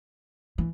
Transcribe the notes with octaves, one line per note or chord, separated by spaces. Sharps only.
E3